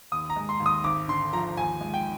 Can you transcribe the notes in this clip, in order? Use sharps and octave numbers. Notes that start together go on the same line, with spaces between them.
D#2 D#6
A#5
G#3
C6
D#2
D#6
G#1 D6
D3 C6
F3 A#5
D#2 G#5
G#3
G5